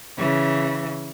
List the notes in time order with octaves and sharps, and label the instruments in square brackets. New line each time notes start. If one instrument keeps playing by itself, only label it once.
[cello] C#3 E3